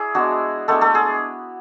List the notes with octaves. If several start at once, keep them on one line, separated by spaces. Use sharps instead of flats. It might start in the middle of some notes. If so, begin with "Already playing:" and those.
Already playing: E4 G#4 D5 E5
G#3 B3 D4 F#4
G#3 A3 B3 D4 A4
A3 A4
G#4